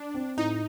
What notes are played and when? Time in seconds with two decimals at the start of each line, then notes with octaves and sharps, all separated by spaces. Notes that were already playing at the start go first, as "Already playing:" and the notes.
Already playing: D4
0.14 C4
0.37 A2 D#4